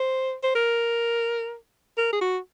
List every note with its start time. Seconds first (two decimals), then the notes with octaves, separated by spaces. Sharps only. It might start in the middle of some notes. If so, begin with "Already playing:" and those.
Already playing: C5
0.43 C5
0.55 A#4
1.98 A#4
2.13 G#4
2.21 F#4